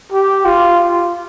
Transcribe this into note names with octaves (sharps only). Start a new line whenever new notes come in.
G4
F4